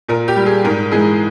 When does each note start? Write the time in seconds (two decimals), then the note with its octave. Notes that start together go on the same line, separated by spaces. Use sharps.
0.09 A#2 A#4
0.28 G4
0.36 G3
0.46 G#4
0.64 G#2 A#4
0.92 E3 G#3 G#4